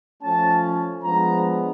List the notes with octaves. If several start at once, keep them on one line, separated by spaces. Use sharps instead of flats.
F3 A3 C#4 A5
F3 G#3 B3 D4 A#5